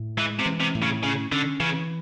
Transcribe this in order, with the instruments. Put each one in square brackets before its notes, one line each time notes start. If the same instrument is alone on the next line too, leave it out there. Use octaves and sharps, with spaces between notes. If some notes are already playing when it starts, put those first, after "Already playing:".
Already playing: [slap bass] A2
[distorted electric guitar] E3 [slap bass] G#3
[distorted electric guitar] C3
[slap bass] E3
[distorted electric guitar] C3
[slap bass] A2
[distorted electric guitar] C#3
[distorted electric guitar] C#3 [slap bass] C#4
[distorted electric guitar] D3 [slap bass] C#4
[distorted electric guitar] C#3 [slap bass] E3